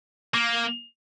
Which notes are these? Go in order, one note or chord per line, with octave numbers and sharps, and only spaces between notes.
A#3